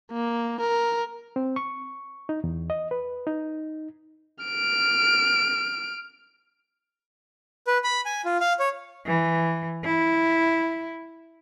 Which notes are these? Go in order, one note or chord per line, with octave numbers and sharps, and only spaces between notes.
A#3
A#4
C4
C#6
D#4
E2
D#5
B4
D#4
F6 D7
B4
B5
G#5
F4
F5
C#5
E3
E4